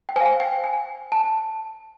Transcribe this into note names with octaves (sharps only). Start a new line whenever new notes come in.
G5
C5 F5 G#5
G5
G#5
A5